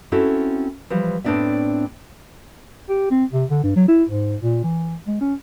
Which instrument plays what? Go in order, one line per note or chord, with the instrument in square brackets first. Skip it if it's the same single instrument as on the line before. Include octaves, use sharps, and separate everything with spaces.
[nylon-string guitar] C4 C#4 E4 F#4 A4
E3 F3 G3
A2 B3 C4 D4 D5 E5
[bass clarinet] G4
C4
C3
D3
G2
F#3
E4
G#2
A#2
E3
G#3
C#4